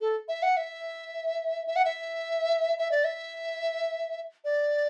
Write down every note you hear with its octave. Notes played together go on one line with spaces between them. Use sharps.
A4
E5
F#5
E5
E5
F#5
E5
E5
D5
E5
D5